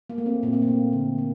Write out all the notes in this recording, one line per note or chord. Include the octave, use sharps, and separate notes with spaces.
A#3
A3
C4
A#2 A#3
C4
A#3
A3
D3
A#3